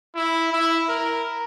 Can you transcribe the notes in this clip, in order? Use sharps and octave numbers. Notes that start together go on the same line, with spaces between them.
E4
E4
A#4